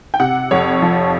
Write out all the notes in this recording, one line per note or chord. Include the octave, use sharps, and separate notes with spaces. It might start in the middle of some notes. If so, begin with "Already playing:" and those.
G5
C3 F#5
F2 C#5
F3